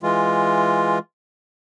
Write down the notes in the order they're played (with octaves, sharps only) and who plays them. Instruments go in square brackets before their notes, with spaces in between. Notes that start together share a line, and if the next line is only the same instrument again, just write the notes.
[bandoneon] E3 G#3 F4